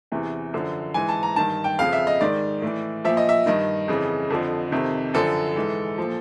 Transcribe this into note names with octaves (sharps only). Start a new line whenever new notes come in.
E2 C3 E3
F#2 D3 F3
G#2 E3 G#5
A5
A#5
G2 D#3 A5
G5
F2 C#3 F3 F5
E5
D#5
G#2 D#3 D5
A2 E3
A#2 F3 E5
D#5
E5
G2 D#3 D#5
F2 C#3 E3
F2 D3 F3
F2 C3 D#3
F#2 D3 F3 A4
G#2 E3
A#2 F3